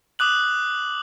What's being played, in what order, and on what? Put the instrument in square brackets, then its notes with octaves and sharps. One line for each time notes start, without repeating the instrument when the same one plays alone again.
[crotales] D6 D#6 F#6 F#7